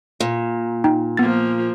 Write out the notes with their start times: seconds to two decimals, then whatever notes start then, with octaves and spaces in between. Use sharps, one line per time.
0.20 A#2
0.84 D#4 G5
1.17 F3 A#3 B3 A6